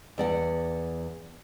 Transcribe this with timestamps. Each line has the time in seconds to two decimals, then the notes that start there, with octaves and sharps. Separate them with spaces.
0.18 E2 D5 F#5